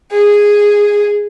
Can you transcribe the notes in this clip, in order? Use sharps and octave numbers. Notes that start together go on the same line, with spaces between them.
G#4